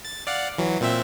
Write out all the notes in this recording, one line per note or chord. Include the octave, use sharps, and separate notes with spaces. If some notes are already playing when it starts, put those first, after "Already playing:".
A6
D5 F5 F#5
E3 F#3
A#2 C4 E5